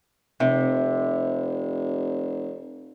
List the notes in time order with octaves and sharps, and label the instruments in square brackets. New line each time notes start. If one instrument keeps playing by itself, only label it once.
[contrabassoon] F1 [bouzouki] C3